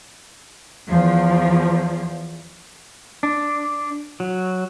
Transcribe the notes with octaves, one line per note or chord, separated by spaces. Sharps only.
E2 F3
D4
F#3